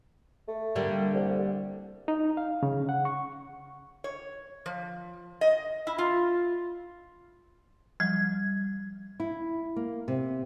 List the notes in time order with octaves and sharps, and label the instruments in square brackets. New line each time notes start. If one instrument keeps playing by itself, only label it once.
[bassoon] A3
[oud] D3 G3 A#3
[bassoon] C2
[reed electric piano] D#4
F5
C#3
F#5
C#6
[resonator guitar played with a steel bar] C#5
F3
D#5
E4
F4
[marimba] F3 G3 [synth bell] G#6
[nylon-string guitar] E4
A#3
C3